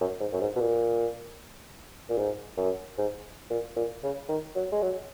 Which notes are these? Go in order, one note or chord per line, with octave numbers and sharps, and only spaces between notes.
F#2
G#2
F#2
G#2
B2
A#2
A#2
G#2
F#2
G#2
A#2
A#2
C#3
D#3
F#3
G#3
F#3